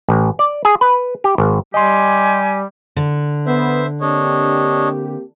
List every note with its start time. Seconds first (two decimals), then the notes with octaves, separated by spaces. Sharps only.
0.08 A1
0.39 D5
0.65 G#4
0.81 B4
1.24 G4
1.38 G#1
1.74 G3 G4 D#5 G#5 C6
2.96 D3
3.46 B3 C5 E5
4.01 A#3 C4 D4 G4 C#5 D#5